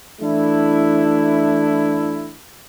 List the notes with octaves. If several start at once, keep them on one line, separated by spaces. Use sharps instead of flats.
E3 A3 D4 E4